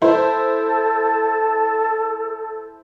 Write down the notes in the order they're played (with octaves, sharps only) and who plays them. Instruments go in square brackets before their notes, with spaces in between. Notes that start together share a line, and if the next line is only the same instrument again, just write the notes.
[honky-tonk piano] E4 C5 [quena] A4